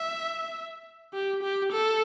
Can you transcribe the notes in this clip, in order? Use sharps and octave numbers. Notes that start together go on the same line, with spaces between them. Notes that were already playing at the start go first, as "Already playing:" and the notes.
Already playing: E5
G4
G4
A4